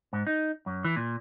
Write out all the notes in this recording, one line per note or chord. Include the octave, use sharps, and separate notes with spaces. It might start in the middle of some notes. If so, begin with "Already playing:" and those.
G#2
D#4
F#2
E3
A#2